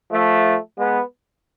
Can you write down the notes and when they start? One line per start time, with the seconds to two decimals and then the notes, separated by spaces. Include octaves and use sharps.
0.11 F3 A3
0.77 G#3 B3